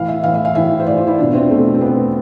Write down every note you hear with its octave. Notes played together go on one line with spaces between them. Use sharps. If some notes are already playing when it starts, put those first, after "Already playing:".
Already playing: A2 E3 F5
E5
A2 E3 F5
E5
F5
A2 E3 E5
C5
A2 E3 D5
F4
E4
E2 B2 D4
C4
E2 B2 A3
C4
E2 B2 B3